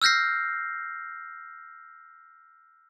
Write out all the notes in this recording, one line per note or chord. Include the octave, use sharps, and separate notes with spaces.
E6 F6 G6 A#6 C7